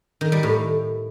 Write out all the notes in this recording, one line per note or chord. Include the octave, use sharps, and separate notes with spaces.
D#3
G3
A2